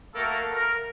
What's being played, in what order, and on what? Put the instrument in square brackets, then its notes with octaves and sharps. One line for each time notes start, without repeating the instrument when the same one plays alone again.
[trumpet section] A3 A#3 F#4 A4 A#4
A#4